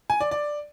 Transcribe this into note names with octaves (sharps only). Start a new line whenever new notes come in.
G#5
D5
D5